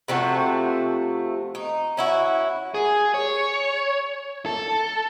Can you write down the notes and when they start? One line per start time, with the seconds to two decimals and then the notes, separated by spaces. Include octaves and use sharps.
0.08 C3 F3 A3 F#4
1.55 D#4
1.97 C#4 E4 F#4
2.74 G#4
3.14 C#5
4.46 A4